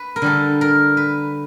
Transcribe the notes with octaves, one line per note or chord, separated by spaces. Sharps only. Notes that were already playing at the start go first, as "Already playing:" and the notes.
Already playing: B4
A#4
D3 G3 A4
A#4
B4